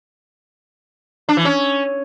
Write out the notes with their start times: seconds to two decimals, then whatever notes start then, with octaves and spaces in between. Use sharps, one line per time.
1.29 D4
1.37 E3
1.45 C#4